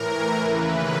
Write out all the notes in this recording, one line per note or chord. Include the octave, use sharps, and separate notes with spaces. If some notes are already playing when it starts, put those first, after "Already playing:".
Already playing: A2 E3 A#4
D#2 C#3 E3 B4